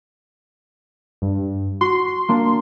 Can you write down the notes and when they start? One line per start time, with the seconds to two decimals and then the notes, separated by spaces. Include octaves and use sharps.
1.22 G2
1.81 F#4 C6
2.29 A#3 D4